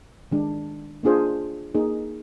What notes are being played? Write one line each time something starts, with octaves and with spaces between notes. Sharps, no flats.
D#3 G#3 D4
A#3 D4 F4 G#4 C5
A#3 D#4 G#4